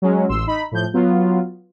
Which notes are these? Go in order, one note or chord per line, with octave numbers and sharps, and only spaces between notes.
F#3 G#3 C#4
A1 C6 E6
D#4 B5
A2 F3 G6
F#3 B3 F4